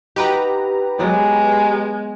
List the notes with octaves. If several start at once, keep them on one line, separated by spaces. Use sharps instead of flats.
D#4 F#4 G4 B4 A#5
F#3 G#3 B3 D5